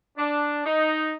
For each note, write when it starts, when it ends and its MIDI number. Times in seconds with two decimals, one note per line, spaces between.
0.18 0.64 62
0.66 1.13 63